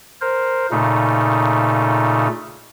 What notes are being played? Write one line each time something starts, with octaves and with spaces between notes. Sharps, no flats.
A#4 C5
A#2 C#3 A3 D#4